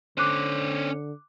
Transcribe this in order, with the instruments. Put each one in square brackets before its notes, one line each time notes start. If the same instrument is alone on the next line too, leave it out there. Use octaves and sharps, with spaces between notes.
[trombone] D3 [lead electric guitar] C#4 C5 [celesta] D6 F#6 D#7